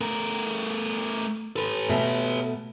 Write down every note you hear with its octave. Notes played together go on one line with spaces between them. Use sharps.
A3 A#4
A4 B4
B2 A3